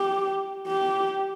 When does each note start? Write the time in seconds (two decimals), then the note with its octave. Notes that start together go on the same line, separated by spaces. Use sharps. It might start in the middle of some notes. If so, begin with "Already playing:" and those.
Already playing: G4
0.67 G4